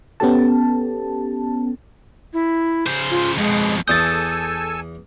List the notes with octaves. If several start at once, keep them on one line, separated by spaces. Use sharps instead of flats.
B3 C#4 G4 A4 A5
E4
C#3 C5
F4
F2 B2 G#3
E2 A4 G#5 D#6 E6 G6 A6